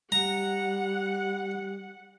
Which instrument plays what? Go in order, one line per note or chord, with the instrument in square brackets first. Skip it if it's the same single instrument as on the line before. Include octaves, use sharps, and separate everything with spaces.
[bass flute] G3 [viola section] F#5 [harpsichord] A#5